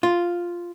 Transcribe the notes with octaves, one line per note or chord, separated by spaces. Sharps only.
F4